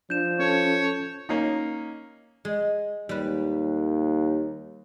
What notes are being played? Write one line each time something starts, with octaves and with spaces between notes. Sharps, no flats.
F3 D4 G6 E7
C#4 A4 C#5 A5
A#3 C#4 D#4
G#3
D#2 G3 B4